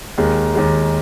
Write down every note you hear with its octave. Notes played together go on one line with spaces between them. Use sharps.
D#2 D#3 G#3
D#2 D#3 G#3